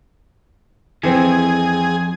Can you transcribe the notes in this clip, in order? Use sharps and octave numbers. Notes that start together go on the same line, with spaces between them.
F2 E3 C4 G#4